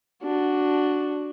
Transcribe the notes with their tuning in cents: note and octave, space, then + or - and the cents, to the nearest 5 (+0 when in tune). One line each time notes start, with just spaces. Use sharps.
D4 +0 F#4 +0